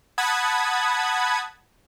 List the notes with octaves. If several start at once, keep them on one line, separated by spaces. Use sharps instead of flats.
F#5 A5 B5 D#6 G#6